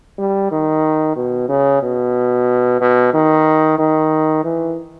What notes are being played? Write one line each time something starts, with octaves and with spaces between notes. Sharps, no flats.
G3
D#3
B2
C#3
B2
B2
D#3
D#3
E3